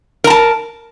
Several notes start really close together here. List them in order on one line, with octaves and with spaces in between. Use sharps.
A#4 A#5 A5